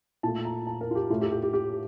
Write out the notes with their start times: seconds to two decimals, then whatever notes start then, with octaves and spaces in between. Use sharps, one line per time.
0.23 A#2 A3 A5
0.45 A#5
0.67 A5
0.81 A#4
0.91 F4
0.95 G4
1.10 A2 A3 F4
1.21 G4
1.32 G4
1.43 G4
1.53 G4